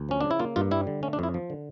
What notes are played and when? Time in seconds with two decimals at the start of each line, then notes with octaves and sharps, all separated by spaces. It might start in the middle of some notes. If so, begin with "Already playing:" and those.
Already playing: D2
0.09 F3 C#4
0.21 C#3 D4
0.31 E4
0.40 A#3 F4
0.56 G2 F4
0.71 G3 E4
0.87 D3
1.03 A3 C#4
1.13 D4
1.19 F2 E4
1.34 F3
1.50 D3